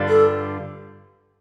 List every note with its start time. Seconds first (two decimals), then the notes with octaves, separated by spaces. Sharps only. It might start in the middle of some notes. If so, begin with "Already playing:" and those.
Already playing: G2 D3 G3 D4 F4
0.09 A4